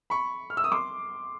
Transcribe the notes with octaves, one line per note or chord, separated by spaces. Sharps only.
B5 C#6
F6
E6
D#6
C6 D6